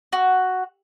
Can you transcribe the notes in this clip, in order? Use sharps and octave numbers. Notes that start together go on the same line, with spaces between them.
F#4